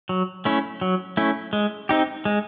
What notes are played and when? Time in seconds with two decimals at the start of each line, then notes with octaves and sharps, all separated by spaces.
0.09 F#3
0.45 A3 C#4 E4
0.81 F#3
1.17 A3 C#4 E4
1.53 G#3
1.89 C4 D#4 G4
2.25 G#3